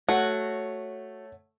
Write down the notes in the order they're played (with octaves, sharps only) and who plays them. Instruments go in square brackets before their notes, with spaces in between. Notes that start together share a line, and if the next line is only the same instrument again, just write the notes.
[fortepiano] A3 [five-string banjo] F#4 [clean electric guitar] C#5 F#5